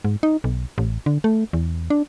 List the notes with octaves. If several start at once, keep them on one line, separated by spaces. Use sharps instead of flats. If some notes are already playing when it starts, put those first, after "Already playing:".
G#2
D#4
B1
A1
D3
A3
E2
D4